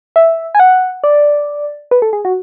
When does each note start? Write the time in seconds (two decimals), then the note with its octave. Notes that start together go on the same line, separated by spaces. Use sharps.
0.16 E5
0.55 G#5
0.60 F#5
1.04 D5
1.91 B4
2.02 A4
2.13 G#4
2.25 F#4